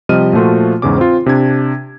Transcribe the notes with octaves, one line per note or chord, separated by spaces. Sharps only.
C3 F3 G3 D#5 F6 D#7
A#2 F3 A3 F4 F#4
E2 G#2 C#3 C#4 D6
C4 F4
C3 D4 G#6